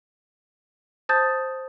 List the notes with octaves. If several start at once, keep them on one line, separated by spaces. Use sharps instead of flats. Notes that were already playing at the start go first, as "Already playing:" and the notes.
C5 A5 D#6 G6 A6